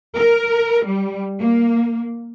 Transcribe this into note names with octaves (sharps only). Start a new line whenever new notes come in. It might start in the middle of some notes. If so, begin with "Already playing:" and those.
A#4
G3
A#3